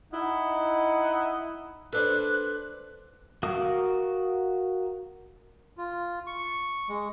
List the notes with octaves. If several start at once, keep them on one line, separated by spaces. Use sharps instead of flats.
D#4 E4 D#5 F#5
D4 A4 B4 C5 F#6
F#4 A#4 F5 C#6 D#6
F4
C#6
G#3